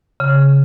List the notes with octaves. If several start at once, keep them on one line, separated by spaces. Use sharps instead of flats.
C#3